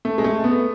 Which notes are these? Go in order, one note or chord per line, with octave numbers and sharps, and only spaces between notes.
A3
G#3
A3
B3